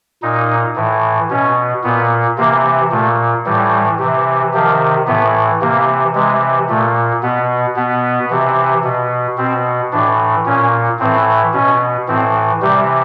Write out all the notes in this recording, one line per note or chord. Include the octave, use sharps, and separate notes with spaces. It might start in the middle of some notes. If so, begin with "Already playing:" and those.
A#2 D#4
A2 E3
B2 C#4
A#2 B3
C3 E3 A#3
A#2 A3
A2 E3 G3
C3 E3
C3 D#3 F3
A2 E3 B3
C3 E3 A#3
C3 E3 G#3
A#2 A3
B2 B3
B2 B3
C3 E3
B2
B2 C4
A2 E3 D4
A#2 C#4
A2 E3 C4
B2 C#4
A2 E3 C4
C3 E3 G3